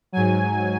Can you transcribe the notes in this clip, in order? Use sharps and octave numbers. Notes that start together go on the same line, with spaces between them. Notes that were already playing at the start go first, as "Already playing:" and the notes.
G#2 F#3 G#5